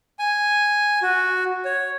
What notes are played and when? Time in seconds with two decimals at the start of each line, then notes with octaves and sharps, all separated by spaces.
0.19 G#5
1.02 F#4
1.65 C#5